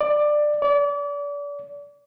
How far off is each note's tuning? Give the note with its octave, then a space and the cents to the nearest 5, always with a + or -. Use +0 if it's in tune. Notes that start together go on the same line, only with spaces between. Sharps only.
D5 +15
D5 -35